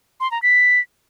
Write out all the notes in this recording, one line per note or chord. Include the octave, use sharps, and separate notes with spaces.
C6
A#5
B6